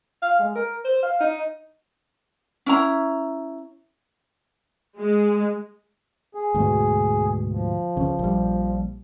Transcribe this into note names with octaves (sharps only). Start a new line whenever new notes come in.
F5
G#3
A#4
C5
F5
D#4
C#4 E4 A#5
G#3
G#4
D2 G#2 B2
F3
C#2 C#3
A#1 G3